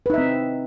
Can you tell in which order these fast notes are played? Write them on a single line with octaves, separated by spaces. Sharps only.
B4 D#4 E5 C4